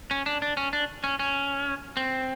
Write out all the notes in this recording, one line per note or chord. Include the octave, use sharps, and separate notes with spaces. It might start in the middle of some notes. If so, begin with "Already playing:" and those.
C#4
D4
D4
C#4
D4
C#4
C#4
C4